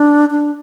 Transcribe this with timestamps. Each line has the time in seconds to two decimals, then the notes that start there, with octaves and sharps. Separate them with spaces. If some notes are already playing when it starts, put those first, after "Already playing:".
Already playing: D4
0.31 D4